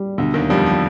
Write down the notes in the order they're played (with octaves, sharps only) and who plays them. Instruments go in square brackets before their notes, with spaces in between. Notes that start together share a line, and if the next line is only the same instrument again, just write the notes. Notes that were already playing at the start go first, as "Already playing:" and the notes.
Already playing: [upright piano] G3
[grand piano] D2 D3 [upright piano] B2
[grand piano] D#2 D#3
[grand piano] F2 F3 [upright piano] G3
[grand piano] F3